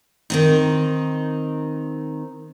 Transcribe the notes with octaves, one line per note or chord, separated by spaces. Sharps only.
D#3 C4 D#4